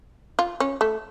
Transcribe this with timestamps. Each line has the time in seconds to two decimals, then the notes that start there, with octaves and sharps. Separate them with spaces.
0.39 F4
0.60 C#4
0.81 A3